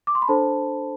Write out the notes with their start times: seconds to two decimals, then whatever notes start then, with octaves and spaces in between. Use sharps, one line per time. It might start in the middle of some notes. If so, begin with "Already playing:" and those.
0.07 D6
0.15 C6
0.22 B5
0.28 D4 A4 C5 A5